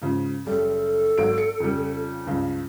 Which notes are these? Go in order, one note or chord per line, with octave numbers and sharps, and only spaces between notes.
G#2 C#3 F3
F#1 G3 A4
G#1 F#3 D7
C#7
F2 C#3 G3
C#2 G2 C#3